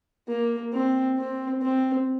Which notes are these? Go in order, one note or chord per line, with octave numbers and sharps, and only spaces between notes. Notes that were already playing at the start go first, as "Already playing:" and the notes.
A#3
C4
C4
C4